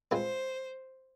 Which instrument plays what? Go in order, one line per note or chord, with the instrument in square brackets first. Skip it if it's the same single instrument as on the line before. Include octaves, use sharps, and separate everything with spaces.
[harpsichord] G#3 C4 F4 B4 [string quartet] C5